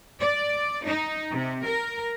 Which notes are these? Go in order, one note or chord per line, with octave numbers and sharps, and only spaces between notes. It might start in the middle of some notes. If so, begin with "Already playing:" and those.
D5
D#4
C3
A#4